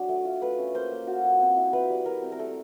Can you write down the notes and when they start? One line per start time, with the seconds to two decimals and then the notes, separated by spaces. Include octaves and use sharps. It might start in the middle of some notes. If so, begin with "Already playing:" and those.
Already playing: F#3 D4
0.09 A3
0.25 F4
0.41 A3 B4
0.58 C#4
0.74 A#3 C5
0.92 A#3
1.07 F4 F#4
1.24 F4
1.40 C4
1.56 E4
1.73 E4 B4
1.90 G3
2.06 E4 A#4
2.22 C4
2.32 A#4
2.39 A3 A4